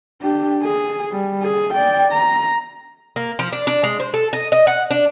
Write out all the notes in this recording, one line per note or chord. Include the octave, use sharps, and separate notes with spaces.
D4 G4
G#4
G3
G#4
D5 G5
A#5
A#3
F3
D4
D4
G#3
C5
A4
D#5
D#5
F#5
D4